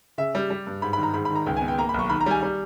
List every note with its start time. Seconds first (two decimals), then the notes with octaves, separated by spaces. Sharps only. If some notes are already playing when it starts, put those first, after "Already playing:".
0.18 C#3 E5
0.35 G3
0.50 G3
0.67 G2
0.82 G#2 B5
0.93 B5
0.98 D#3
1.03 A#5
1.14 G#2 B5
1.25 B5
1.30 D#3
1.36 A#5
1.46 C#2 G5
1.57 G#5
1.62 B3
1.68 G5
1.78 A#3 A#5
1.89 B5
1.94 B1 C#6
2.09 D#3 B5
2.21 A#5
2.26 G3 G#5
2.43 G3